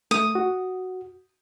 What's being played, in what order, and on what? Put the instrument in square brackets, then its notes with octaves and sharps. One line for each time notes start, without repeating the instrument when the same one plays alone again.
[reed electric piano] A3 [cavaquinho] D#6
[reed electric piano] F#4